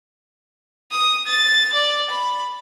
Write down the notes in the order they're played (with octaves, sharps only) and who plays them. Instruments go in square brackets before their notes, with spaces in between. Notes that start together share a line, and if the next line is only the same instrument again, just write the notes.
[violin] D#6
A6
D5
B5